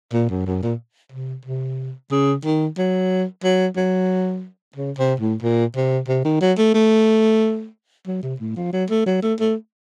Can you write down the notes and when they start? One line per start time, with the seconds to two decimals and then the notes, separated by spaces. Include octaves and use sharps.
0.13 A#2
0.29 F#2
0.46 F#2
0.62 A#2
1.12 C3
1.45 C3
2.11 C#3
2.44 D#3
2.78 F#3
3.44 F#3
3.76 F#3
4.76 C#3
4.98 C3
5.20 A2
5.42 A#2
5.76 C3
6.08 C3
6.25 D#3
6.41 F#3
6.58 A3
6.74 A3
8.07 F#3
8.23 C3
8.40 A2
8.56 F3
8.73 F#3
8.90 A3
9.06 F#3
9.22 A3
9.39 A3